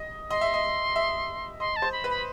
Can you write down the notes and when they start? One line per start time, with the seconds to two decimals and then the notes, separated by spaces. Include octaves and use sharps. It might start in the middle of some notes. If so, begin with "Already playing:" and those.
Already playing: D#5
0.31 D#5 C6
0.41 E5
0.54 D#5
0.96 E5
1.60 D#5 C6
1.76 A5
1.82 C5
1.92 B5
2.04 B4
2.10 B5